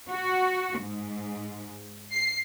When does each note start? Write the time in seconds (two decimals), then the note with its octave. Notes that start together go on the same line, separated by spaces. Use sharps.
0.10 F#4
0.80 G#2
2.12 C7